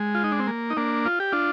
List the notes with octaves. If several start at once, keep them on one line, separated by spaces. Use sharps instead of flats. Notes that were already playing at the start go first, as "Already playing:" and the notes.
Already playing: G#3
F4
D#4
D4
C4
A#3
D#4
A#3 D4
F4
G4
D4 F4